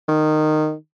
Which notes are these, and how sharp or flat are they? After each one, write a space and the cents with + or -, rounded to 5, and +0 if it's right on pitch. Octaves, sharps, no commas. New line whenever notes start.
D#3 -15